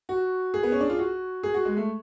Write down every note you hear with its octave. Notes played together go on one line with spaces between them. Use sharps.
F#4
G#4
B3
C#4
D4
F4
F#4
G#4
F#4
G#3
A3